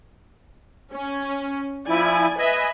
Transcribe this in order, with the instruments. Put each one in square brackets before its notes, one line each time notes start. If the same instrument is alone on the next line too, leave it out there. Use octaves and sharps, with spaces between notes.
[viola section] C#4
[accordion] F3 E4 [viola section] D5 G#5
[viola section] B4 E5 [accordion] D#5 G#5